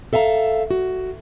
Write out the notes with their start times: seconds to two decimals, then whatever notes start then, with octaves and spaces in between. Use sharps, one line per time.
0.13 A4 E5 F5 A5 A#5
0.71 F#4